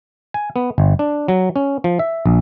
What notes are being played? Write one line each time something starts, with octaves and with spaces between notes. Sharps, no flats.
G#5
B3
G1
D4
F#3
C#4
F3
E5
A#1